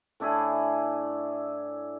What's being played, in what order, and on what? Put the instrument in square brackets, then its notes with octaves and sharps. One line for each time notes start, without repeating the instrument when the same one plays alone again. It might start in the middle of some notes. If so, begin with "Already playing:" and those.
[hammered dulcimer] A2 D4 E4 G#4